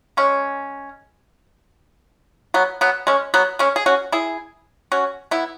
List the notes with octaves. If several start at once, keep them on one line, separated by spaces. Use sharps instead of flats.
G#3 C#4
F#3 B3
F#3 B3
G#3 C#4
F#3 B3
G#3 C#4
G#4
C#4 F#4
E4 G#4
C#4 F#4
B3 E4